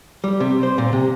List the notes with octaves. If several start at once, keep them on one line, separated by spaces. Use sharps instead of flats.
G3
C3
C5
A#2
C3